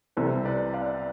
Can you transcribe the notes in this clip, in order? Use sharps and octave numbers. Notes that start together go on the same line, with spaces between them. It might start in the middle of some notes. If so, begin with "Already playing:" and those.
C2 C3 E3 A4 C5
B4 D5
D5 F5